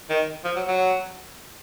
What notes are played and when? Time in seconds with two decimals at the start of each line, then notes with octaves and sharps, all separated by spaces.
0.09 D#3
0.44 F3
0.56 F#3
0.67 F#3